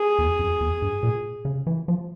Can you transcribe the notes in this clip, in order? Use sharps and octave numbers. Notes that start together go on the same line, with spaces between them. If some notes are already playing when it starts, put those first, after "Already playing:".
Already playing: G#4
E2
F2
E2
G2
A#2
C#3
E3
F3